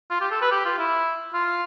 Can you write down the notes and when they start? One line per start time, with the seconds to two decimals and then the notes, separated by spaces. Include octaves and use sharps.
0.11 F4
0.21 G4
0.31 A4
0.41 B4
0.51 G4
0.65 F4
0.79 E4
1.34 F4